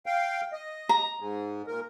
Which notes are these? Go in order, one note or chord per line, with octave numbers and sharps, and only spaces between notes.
F5 G5
D#5
A#5
G#2 G#3
A#2 A#4